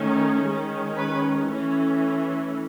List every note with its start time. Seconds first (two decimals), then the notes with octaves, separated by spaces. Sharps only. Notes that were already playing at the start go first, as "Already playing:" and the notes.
Already playing: D#3 A3 C#4
0.43 D#3 G#3 C#4
0.97 B4
1.50 E3 A3 C#4